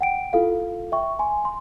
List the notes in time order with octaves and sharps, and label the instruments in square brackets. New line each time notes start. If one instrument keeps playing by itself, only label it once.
[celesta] F#5 G5 D7
E4 F4 A4 F5
E5 G5 C#6
G#5 C6
C6